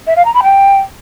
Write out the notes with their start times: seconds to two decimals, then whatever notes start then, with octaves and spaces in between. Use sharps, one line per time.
0.07 E5
0.16 F5
0.25 A#5
0.34 B5
0.43 G5